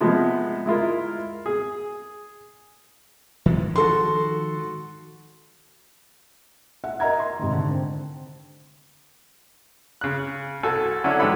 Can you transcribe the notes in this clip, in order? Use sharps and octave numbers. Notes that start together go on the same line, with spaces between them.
C3 F3 G#3 B3
G#3 E4 F4 A#4
G#4
D#3 F3 G#3
F#4 A4 C6
E5 F#5
A#4 D#5 E5 A#5 G#6
C6
G#2 C3 D#3
D3
C4
C#3 F#6
C2 F#4 A4 G#5
D3 F#3 C#4 D4 E4
G#2 E3 G4 A4 F#5 B5